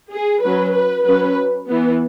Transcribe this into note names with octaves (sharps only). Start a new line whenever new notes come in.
G#4
F#3 C#4 B4
B4
F#3 C#4 B4
E3 B3